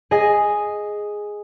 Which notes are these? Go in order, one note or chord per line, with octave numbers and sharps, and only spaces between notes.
G#4 D#5 G#5